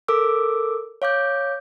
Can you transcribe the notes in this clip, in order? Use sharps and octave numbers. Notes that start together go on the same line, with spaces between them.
A4 A#4 D6 E6
C#5 F5 D6 G6